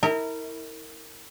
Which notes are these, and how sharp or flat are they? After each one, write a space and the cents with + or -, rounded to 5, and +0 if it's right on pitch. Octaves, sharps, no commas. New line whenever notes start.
E4 -35 A#4 -25